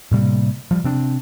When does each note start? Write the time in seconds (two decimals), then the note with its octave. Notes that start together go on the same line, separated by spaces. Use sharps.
0.11 A2 C3 G3 A#3
0.71 F3 G3
0.84 C3 C4 D4